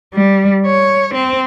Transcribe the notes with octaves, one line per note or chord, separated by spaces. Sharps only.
G3
C#5
C4